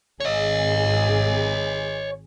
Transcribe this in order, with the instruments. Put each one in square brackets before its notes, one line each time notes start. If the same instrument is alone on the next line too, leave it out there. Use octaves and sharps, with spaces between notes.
[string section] G#1 G#4 [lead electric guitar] C#5 D#5